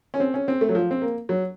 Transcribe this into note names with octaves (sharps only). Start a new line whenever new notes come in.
C#4
C4
C#4
C4
A3
F#3
F3
C4
A#3
F#3